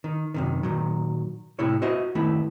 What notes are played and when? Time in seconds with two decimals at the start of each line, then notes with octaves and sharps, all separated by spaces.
0.04 D#3
0.34 F#2 C3 D#3
0.63 A#2 D#3 F#3
1.59 A2 C3 E4 C#5
1.82 F#4 C5 D#5 E5
2.15 D#3 A3 B3 E4